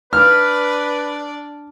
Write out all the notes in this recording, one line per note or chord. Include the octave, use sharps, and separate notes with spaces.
D4 B4 D5 F6